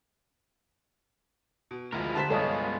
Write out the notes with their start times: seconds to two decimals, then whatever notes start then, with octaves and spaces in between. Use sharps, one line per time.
1.71 B2
1.92 D2 F3 G#3 E4 A#4
2.15 D3 G4 C5 A5 B6
2.30 C2 G2 G#3 B3 F4 A4 C#5 D#5